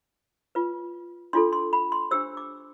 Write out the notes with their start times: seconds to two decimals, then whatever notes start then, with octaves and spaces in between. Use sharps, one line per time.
0.55 F4 B4
1.33 D4 F4 A4 C6
1.53 C6
1.73 B5
1.92 C6
2.11 D4 G4 C5 E6
2.37 D6